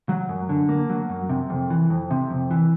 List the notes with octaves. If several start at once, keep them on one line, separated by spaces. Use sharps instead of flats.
F#3
F#2
D3
A#3
F#3
F#2
C3
F2
E3
F2
C3
F2
E3